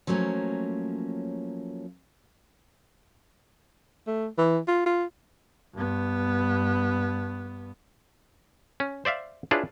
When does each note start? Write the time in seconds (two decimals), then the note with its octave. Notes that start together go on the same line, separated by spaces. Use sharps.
0.07 F3 F#3 A3 A#3 C#4
4.07 A3
4.38 E3
4.67 F4
4.86 F4
5.75 G2 B3
8.80 C#4
9.05 C5 D5 E5 F5
9.51 D4 E4 F4 G#4 B4 C#5